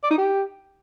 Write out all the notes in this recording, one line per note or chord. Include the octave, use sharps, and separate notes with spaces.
D5
D#4
G4